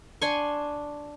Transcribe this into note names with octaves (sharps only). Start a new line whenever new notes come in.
D4 G#5 C6 C#6